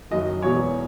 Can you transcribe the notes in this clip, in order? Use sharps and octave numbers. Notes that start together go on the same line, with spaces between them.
F#1 F#2 D#3 F#3 D#5
E1 E2 B2 C#5